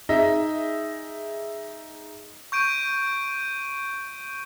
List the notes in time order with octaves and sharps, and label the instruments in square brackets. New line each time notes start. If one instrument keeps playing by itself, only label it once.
[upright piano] D#4 G#4 D#5 E5
[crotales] C#6 G6 D7 D#7